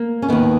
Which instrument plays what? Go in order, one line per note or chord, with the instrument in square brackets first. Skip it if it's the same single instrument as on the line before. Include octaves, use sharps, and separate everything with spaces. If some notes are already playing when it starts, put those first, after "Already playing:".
Already playing: [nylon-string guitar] A#3
C#4
D#2 D#3 B3